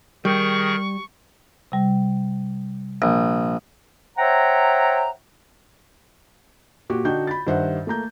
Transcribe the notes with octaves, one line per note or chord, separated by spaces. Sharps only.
D#3 G3 G#4 A#4 C#6
C3 G3
A#1
C5 C#5 E5 F#5 G5 A#5
A#2 F#4 G4
D3 D4 D#4 F#4 G5 G6
B5 A6
G2 D#3 C5 E5 F#5
A3 A#3 A#5 G6